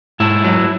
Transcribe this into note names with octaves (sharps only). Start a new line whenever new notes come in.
G#2 E4
F#3